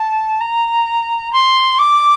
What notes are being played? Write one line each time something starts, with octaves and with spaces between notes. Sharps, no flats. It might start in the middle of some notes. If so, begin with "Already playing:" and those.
Already playing: A5
A#5
C6
D6